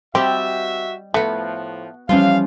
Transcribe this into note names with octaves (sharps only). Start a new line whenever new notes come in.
G3 C4 F#4 G4 D#5 E5
A2 F3 A3 B3 F#4
E3 F3 G3 C#4 F4 F5